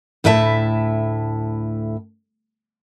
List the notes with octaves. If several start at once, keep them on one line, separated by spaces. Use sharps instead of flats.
D2 A2 E4 E5 F#5 A5